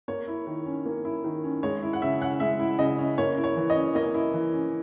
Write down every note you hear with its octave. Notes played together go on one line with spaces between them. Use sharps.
A#3 C#5
E4
D#3
C#4
A#3
E4
D#3
C#4
G#3 C#5
E4
F#5
C#3 E5
C#4 F#5
G#3 E5
E4
C#3 D#5
C#4
A#3 C#5
E4
C#5
E3
D#5
C#4
A#3 D#5
E4
E3
C#4